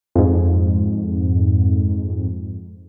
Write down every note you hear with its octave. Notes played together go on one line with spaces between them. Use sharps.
F2 G#2